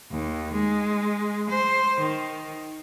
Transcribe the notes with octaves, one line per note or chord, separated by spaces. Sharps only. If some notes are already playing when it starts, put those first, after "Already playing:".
D#2
G#3
C5
D#3